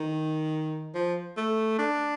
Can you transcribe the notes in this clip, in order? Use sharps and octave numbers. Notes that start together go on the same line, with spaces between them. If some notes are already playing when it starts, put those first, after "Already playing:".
Already playing: D#3
F3
A3
D4